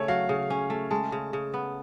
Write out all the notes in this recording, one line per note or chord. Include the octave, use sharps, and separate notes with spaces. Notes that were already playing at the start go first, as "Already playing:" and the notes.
Already playing: C#3 A3 C#4 C#5
F#3 F5
C#3
C#4
A3
G#3 A5
C#3
C#3
B3